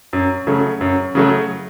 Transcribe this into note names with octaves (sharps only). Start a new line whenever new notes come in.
F#2
C#3 F#3 A3
F#2
C#3 F#3 A3